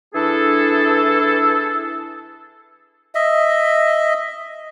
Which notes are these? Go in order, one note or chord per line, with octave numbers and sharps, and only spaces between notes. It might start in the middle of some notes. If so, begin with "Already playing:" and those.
E3 D4 E4 G#4 A4
D#5 E5